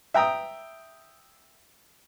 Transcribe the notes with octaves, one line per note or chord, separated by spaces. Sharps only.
E5 G5 A#5 D#6